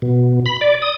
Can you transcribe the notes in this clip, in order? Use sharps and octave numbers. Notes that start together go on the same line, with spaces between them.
B2
B5
D5
D#6